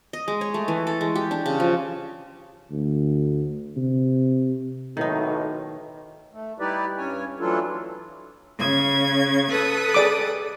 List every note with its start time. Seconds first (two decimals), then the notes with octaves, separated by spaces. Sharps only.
0.13 D#5
0.28 G#3
0.41 C#5
0.54 A3
0.68 E3
0.87 A4
1.01 G#3
1.15 G4
1.31 D4
1.46 C#3
1.60 F3
2.71 D2
3.77 C3
4.97 B1 A2 D#3 D#4
6.33 A3
6.59 G3 D#4 E4 G4 B4 D5
6.97 G2 C#4 C#5 G#5
7.39 E3 F#3 A3 D4 F4 A4
8.57 C#3 G#6
9.50 A4 B4 D#6
9.94 G#4 D5 D6